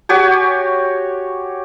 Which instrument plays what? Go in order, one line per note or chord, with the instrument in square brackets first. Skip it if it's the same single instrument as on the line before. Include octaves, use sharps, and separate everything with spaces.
[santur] F#4 G4 C#5 G#5